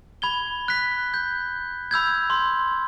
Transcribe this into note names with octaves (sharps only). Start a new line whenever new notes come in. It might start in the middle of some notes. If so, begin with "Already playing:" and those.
B5 G#6 G7
F#6 B6
G6
B5 E6 G6 G#6
C6